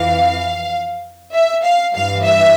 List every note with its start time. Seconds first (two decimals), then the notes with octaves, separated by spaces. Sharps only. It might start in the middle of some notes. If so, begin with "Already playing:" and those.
Already playing: F2 E3 F5
1.33 E5
1.63 F5
1.93 G2 E3 F5
2.24 E5